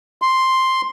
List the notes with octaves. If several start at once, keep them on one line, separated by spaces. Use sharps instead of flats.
C6